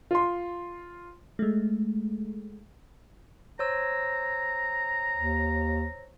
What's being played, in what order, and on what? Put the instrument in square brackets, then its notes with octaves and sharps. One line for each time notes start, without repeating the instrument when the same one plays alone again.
[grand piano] F4 C6
[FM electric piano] G#3 A3
[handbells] C5 C#5 E6 [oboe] A#5
[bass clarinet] D#2